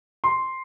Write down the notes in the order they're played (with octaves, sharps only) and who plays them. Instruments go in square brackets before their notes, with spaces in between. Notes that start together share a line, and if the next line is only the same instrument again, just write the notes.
[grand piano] C6